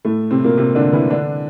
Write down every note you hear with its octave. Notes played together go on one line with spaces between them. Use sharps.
A2 A3
C3 C4
A#2 A#3
C3 C4
D3 D4
E3 E4
D3 D4